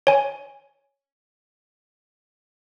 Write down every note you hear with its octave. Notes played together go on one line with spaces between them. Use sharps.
C#5 G#5